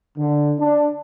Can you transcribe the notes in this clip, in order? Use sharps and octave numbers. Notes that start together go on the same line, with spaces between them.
D3
D4